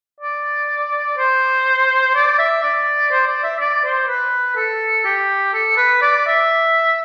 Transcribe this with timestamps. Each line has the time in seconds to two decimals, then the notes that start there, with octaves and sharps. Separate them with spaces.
0.21 D5
1.17 C5
2.15 D5
2.39 E5
2.63 D5
3.11 C5
3.27 D5
3.44 E5
3.60 D5
3.84 C5
4.08 B4
4.56 A4
5.05 G4
5.53 A4
5.77 B4
6.02 D5
6.27 E5